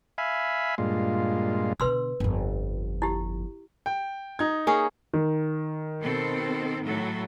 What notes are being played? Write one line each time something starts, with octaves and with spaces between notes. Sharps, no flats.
E5 F5 G#5 B5
G2 A#2 G#3 F4
B2 D3 B4 C6 E6
G1 F2
E4 G4
G5
D#4 G#6
A#3 C#4 G#4
D#3
B2 C4 A4
A2 F#3 A4